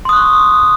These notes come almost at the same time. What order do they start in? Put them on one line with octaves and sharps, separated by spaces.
C6 D#6 F#6 C#6